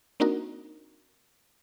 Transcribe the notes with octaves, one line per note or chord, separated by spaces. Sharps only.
A#3 C4 D4 D#4 F#4 A#4